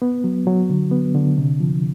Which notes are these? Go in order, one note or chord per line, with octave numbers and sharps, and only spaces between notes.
B3
F#3
F#3
D3
B3
D3
C3
F3